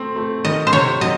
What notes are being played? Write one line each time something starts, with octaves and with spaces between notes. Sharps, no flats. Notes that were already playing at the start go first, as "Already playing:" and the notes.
Already playing: A3 C4
A3
D#3 D#5
C5
C3 C#5
F#3 D#5